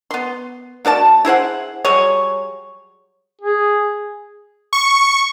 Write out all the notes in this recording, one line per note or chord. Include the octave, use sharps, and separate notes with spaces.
B3 C6
A#3 F#4 D5 A5
E4 G#4 C5 F#5
F#3 G3 G#4 C#5
G#4
C#6